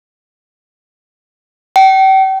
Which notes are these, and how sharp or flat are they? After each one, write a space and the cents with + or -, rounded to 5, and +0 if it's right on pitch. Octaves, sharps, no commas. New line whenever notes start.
G5 -35